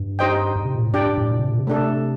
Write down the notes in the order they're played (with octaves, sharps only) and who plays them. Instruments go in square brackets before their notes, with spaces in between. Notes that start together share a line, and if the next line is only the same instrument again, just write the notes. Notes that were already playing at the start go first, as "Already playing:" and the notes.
Already playing: [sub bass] G2
[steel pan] D#4 G4 C5 D#5 G5
[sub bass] G2
C3
A#2
A2
[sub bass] G2 [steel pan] D4 G4 D5 G5
[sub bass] G2
A2
A#2
C3
A#2
C3
[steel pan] A3 D4 A4